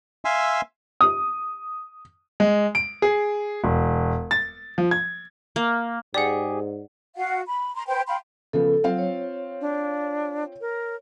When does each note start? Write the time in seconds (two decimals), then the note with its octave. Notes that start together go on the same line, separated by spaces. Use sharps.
0.25 E5 F5 G#5 C6 E6
1.01 D#6
2.40 G#3
2.75 D7
3.02 G#4
3.64 E1
4.31 A6
4.78 F3
4.91 G#6
5.56 A#3
6.14 G#2 G4 G#4 D5 F#5
7.17 F#4 F5 F#5
7.46 B5
7.74 A#5 C6
7.87 B4 C5 G5
8.07 F5 G5 B5 C6
8.53 C#3 F3 B3 A4
8.84 F#3 C4 F4 F5
8.98 C#5
9.61 D4
10.61 A#4